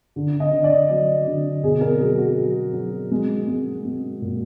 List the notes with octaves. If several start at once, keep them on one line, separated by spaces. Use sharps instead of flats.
D3
D#5
D3
D5
F#3 D5
D3
B2 G#4
A#4
F#3 G#4
F#4
F#3
F#3
G#3
G#3
G#3
A#2